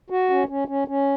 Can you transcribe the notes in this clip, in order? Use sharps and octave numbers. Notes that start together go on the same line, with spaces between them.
F#4
C#4
C#4
C#4
C#4